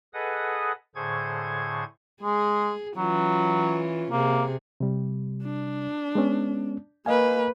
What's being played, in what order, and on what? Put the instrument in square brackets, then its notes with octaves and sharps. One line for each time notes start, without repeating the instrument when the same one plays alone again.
[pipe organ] G#4 A4 B4 D#5 F#5 D#6
A2 D3 G#4 C5 C#6 G#6
[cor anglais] G#3 [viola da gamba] G#4
[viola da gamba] E3 C#4 F4 [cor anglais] F#3
[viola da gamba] C3 G#4 [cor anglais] A#3
[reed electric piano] C3 G3
[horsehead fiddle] D4
[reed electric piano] G#3 B3 C#4
[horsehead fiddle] A#3 B4 [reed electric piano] D#5 F5 G#5